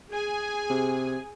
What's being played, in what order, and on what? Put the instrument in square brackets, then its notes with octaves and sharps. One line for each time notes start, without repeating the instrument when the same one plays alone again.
[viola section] G#4 G#5
[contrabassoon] C3